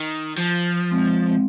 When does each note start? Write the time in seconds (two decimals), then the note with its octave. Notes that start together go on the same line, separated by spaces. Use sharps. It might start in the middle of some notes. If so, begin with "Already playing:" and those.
Already playing: D#3
0.38 F3
0.91 G#3 C4
1.27 G#3 C4